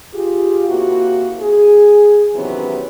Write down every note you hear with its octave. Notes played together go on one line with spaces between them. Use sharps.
F4 G4 G#4
C3 A#3 E4 F#4
G#4
C3 D#3 E3 F#3 B3 C#4